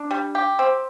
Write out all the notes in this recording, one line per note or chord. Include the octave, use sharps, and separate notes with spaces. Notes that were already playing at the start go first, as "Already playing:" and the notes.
Already playing: D4
G3
G4
C4